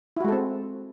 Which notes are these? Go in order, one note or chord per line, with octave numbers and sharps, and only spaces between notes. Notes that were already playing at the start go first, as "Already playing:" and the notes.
G#3 C4 E4 F#4 A4